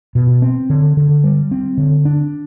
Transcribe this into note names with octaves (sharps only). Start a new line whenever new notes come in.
B2
C4
D3
D3
G3
C4
D3
D4